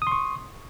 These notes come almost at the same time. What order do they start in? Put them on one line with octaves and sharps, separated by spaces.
D#6 C6 C#6